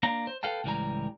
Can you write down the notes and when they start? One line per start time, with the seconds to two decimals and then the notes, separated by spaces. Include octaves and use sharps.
0.03 A#3 D4 F5 A#5
0.27 C5
0.43 A4 B4 F5 G5 A5
0.64 C#2 A2 E3 G3 G#5 A#5